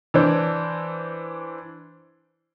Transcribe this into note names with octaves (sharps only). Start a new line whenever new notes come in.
E3 D4 C5